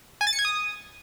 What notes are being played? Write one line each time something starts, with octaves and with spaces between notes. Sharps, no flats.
G#5
A6
C#7
G#6
D#6